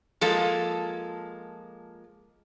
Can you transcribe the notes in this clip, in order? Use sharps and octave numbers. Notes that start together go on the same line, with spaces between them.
F3 G#3 A#3 A4